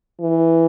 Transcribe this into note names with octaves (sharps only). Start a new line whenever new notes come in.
E3